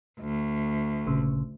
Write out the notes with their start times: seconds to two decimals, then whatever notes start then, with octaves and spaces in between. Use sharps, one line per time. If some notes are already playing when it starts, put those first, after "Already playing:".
0.20 D2
1.06 G#1 A#2 C#3